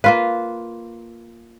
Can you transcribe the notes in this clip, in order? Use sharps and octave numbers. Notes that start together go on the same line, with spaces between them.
A#3 F4 B4 F5